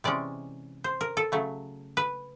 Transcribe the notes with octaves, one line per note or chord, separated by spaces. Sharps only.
C3 E3 G#3 C#4 D5
C5
A#4
A4
C#3 F#3 A3
B4